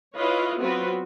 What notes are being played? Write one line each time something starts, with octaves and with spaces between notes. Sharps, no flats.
E4 F4 B4 C#5 D#5 F5
F#3 B3 C4 F4 F#4 B4